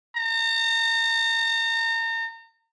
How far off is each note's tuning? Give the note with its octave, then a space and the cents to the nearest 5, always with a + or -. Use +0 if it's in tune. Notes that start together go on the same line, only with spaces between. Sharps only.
A#5 -35